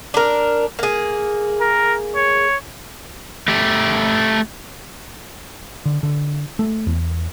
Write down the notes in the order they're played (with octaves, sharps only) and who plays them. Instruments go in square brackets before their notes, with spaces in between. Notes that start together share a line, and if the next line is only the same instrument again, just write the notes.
[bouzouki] D4 A#4
A#3 G#4
[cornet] A#4
C#5
[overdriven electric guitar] A3 G4
[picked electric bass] D3
D3
A3
E2